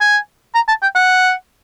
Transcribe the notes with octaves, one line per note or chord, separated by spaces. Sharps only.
G#5
A#5
A5
G5
F#5